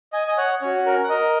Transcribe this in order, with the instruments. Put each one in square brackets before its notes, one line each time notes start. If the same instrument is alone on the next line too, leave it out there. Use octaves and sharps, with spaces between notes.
[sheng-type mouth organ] D#5 G#5
D#5
C#5 F#5
C#4 F#4 C#5
A#4
F#5
A#4 D#5